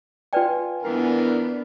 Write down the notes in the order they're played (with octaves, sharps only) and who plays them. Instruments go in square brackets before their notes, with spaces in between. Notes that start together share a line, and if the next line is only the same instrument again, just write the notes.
[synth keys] F4 G#5 [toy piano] B4 D5 G5
[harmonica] E3 A#4 [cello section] B3 D4